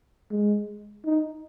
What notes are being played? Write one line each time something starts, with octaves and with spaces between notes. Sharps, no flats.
G#3
D#4